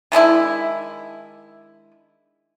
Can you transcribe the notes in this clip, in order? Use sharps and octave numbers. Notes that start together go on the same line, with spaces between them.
D#3 G#3 D4 E4